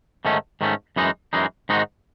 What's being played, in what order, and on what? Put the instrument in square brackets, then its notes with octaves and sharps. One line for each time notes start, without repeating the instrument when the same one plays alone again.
[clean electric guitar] G#2 D#3 A3 C#4
G#2 D#3 A3 C#4
F#2 E3 G#3 D#4
F#2 E3 G#3 D#4
G#2 D#3 G#3 D#4 F#4